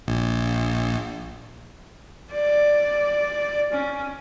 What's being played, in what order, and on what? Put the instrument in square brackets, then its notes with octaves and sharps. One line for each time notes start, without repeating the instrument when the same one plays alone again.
[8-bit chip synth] A#1
[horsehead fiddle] D5
C#4